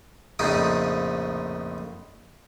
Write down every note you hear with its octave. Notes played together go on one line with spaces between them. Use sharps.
A#1 F2 A2 C#3 D#4